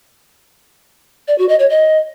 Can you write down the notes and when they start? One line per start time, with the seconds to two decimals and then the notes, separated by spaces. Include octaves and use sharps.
1.28 D5
1.38 F#4
1.49 D#5
1.59 C#5
1.70 D#5